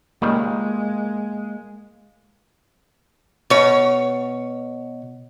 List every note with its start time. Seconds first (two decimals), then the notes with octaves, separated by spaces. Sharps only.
0.22 C#2 D#3 G3 G#3 A#3
3.50 B2 C#5